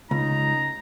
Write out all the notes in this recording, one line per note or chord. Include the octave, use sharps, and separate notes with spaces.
C#2 D#4 A#5